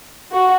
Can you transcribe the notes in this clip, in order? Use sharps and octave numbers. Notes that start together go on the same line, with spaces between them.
F#4